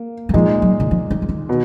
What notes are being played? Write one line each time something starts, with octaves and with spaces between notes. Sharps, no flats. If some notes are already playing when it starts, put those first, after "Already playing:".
Already playing: A#3
F#3
A#2 F3 G#3 D#4
F#3
D#3
F3
D#3
F3
D#3
B2